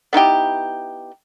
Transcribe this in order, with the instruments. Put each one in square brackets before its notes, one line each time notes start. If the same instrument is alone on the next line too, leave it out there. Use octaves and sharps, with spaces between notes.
[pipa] B3 D#4 E4 G4